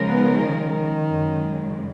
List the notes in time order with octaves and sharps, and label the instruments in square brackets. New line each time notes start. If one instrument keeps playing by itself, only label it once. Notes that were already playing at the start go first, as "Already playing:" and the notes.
Already playing: [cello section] C#3 F3 G#3 D#4 A#4
[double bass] B3
D#3
[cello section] F#2 C#3 G#3